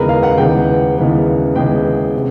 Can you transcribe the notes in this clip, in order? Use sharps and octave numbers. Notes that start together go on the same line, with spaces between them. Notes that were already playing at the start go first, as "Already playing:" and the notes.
Already playing: D#2 C#3 E3 G#3 B3 A#4 B4
F5
F#5
D#2 C#3 E3 G#3 B3 G5
D#2 C#3 E3 G#3 B3
D#2 C#3 E3 G#3 B3 G5
C3